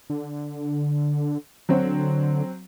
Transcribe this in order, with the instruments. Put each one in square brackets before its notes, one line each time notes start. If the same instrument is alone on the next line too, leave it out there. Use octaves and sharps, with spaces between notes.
[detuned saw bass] D3
[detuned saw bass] D3 [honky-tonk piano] F#3 C4 F#4